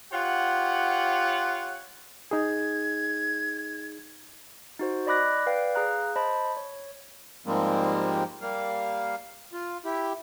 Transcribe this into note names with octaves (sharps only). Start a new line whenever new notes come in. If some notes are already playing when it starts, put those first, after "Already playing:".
F4 G4 C#5 F#5
D#4 G#4 G#6
D#4 F#4 C5
D5 D#5 B5 D6 F#6 A#6
B4 D5 F5 G5
G#4 F5 A#5 F#6
C5 D#5 A5 B5
C#5
G#2 F3 G3 G#3 A#3 C4
G3 A#3 F5
F4
E4 G4